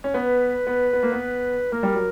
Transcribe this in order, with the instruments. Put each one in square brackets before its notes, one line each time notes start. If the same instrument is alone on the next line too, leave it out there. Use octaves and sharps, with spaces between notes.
[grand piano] C#4
[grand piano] B3 [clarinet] B4
[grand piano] B3
B3
A#3
B3
[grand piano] A#3 [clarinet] A#4
[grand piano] G3
F#3